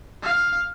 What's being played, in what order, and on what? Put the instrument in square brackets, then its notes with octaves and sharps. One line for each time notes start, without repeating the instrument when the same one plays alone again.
[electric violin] F5